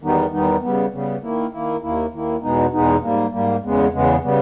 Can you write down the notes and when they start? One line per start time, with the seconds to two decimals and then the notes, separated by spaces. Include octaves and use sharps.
0.02 E2 D#3 G3 B3 D#4
0.32 E2 D#3 G3 B3 D#4
0.62 C#3 G3 B3
0.92 C#3 G3 B3
1.22 D#3 A#3 E4
1.52 D#3 A#3 E4
1.82 D#2 D#3 A#3 E4
2.12 D#2 D#3 A#3 E4
2.42 E2 B2 G#3 B3 D#4
2.73 E2 B2 G#3 B3 D#4
3.03 G#2 G3 A#3
3.32 G#2 G3 A#3
3.63 E2 C#3 G#3 B3
3.93 E2 C#3 G#3 B3
4.23 C#3 G3 B3